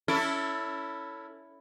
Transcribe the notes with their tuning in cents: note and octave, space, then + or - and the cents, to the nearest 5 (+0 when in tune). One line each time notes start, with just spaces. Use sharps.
C#4 +20 E4 +0 A4 +20